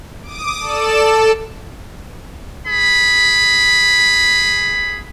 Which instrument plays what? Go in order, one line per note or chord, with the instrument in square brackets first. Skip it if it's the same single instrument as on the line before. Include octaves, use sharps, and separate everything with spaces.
[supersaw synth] D6 D#6
A4 D5 E7
A4
[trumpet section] G#4 B5